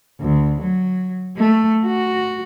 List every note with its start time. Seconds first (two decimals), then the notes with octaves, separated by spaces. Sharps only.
0.21 D2
0.62 F#3
1.37 A3
1.86 F#4